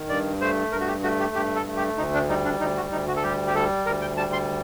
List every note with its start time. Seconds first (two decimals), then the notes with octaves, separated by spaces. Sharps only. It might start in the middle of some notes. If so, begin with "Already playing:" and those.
Already playing: D#3
0.09 G2 D5
0.41 A3 C5
0.72 G2 A#4
0.81 F#4
0.88 G4
1.03 A3 F#4
1.20 G4
1.35 G2 G4
1.56 A4
1.67 A3
1.77 G4
1.98 D2 D#4
2.14 D4
2.29 G3 D#4
2.45 D4
2.60 D2 D#4
2.76 F#4
2.92 D2 D#4
3.08 F#4
3.16 A4
3.23 G3 G4
3.47 G4
3.55 G3 A4
3.86 D2 A#4
4.01 G5
4.17 G3 A5
4.33 C6